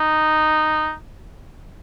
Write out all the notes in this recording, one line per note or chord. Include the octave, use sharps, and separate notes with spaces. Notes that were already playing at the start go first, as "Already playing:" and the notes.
Already playing: D#4